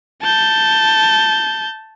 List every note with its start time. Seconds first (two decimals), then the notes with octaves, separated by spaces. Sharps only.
0.22 A5 G6